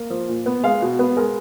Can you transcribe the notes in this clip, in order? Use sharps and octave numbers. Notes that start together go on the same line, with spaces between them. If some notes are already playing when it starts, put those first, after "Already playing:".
Already playing: A#3
F3
A#2
B3
G#3 F5
B2
B3
G#3 A#4